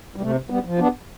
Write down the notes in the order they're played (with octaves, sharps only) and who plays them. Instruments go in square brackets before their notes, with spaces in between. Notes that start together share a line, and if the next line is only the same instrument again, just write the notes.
[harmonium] G3
C3 A3
G3 B3
F3
B3 D4